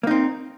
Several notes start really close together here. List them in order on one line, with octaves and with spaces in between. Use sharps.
A#3 D#4 C4